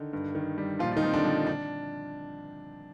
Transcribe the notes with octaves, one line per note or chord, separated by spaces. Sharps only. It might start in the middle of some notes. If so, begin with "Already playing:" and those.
Already playing: D3 D#3 D#4
G2
D#3
G3
A#2 F3 F4
F4
D#3 D#4
F3 C4
D3 D4
F3
D4